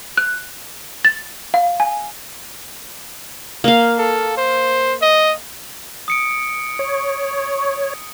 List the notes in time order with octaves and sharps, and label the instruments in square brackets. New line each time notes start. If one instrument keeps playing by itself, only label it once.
[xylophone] F#6
A6
F5
G#5
[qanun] A#3 F5
[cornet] A4
C5
D#5
[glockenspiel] D#6 C#7 D7
[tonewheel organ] C#5